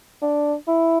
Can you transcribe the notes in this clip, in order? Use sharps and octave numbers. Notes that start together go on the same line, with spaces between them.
D4
E4